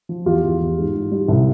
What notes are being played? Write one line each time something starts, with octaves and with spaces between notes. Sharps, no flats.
F3
E2 F4 G4
E2
E2
G#2
G#2
G3
C2